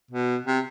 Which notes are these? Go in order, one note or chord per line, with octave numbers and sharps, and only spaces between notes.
B2
C3